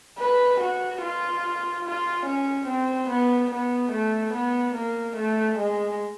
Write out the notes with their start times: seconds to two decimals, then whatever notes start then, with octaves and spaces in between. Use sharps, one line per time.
0.19 B4
0.60 F#4
1.02 F4
1.85 F4
2.26 C#4
2.67 C4
3.10 B3
3.51 B3
3.92 A3
4.33 B3
4.75 A#3
5.17 A3
5.58 G#3